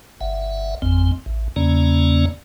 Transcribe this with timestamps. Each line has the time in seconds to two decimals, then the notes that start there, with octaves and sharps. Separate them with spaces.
0.21 G1 E5 F#5
0.82 G#1 F2 C4
1.26 A1
1.56 E2 C#3 A#3 C#4 D5 A#5